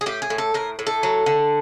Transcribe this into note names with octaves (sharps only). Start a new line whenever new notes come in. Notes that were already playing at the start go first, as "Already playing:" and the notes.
G#4
A2 G4
G#4
A2
A4
A2 A#4
A2
A4
F#3
D3